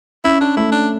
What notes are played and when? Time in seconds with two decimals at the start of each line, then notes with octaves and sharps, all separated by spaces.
0.24 C#4 E4
0.41 D4
0.57 A3 E4
0.72 D4